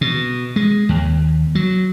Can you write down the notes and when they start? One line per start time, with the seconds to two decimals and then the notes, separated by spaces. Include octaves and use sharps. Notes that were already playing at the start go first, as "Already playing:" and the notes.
0.01 B2
0.56 G#3
0.89 D#2
1.55 F#3